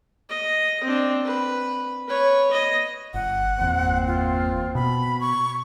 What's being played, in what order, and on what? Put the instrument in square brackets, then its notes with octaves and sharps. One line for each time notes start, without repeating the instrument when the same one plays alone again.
[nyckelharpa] D#5
C4 D4
B4
B4 C#5
D#5
[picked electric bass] G1 [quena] F#5
[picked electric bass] G1 E2 [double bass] A#2 C4
[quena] F4
[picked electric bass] B2 [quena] B5
[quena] C#6